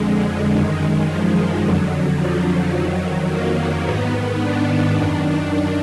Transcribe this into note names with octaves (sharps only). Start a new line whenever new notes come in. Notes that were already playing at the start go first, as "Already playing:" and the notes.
Already playing: F2 D3 G#3
F#2 D#3 G#3
F3
F2 D3 F#3
F3
F2 D#3 F#3
A#3
G#2 D#3 B3
D4
F#2 D#3
D4